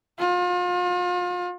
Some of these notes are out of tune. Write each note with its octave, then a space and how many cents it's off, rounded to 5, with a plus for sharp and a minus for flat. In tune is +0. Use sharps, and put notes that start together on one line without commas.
F4 +35